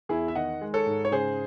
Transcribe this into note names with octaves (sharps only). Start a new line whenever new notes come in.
E2 E4 G#4
E5
D#3 D#5 F#5
G#3
A4 C#5
G#2
C#5
C#3 G#4 C5